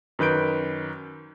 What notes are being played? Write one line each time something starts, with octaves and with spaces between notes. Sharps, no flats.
F#2 D#3 B4 G6 D7